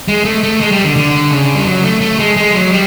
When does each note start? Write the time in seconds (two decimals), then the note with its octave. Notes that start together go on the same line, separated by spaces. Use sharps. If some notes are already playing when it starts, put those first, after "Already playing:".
0.08 G#3
0.25 A3
0.43 A3
0.61 G#3
0.72 G3
0.84 D3
0.96 D3
1.31 C#3
1.55 G3
1.66 F#3
1.83 A3
2.01 A3
2.19 G#3
2.37 G#3
2.53 F#3
2.71 G3